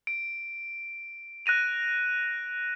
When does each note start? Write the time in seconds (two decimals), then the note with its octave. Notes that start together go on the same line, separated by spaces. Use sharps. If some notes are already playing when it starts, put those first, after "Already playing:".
0.07 D7
1.46 F#6 A#6 D#7 F7